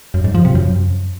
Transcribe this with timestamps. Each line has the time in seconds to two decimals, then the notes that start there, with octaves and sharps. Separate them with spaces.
0.14 F#2
0.24 G#2
0.35 F3
0.45 C3
0.55 F#2